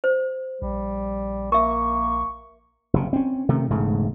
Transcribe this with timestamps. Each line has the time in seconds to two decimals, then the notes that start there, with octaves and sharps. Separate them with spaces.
0.04 C5
0.62 A#1 G3
1.52 A#3 A#4 E5 C#6
2.94 F#1 C3
3.13 C4 C#4
3.49 C3 D#3 A3
3.70 E1 G#2 C#3 A3